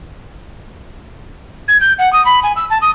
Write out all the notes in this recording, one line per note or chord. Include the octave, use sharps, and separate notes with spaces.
G#6
G6
F#5
D#6
B5
G#5
E6
A5
D#6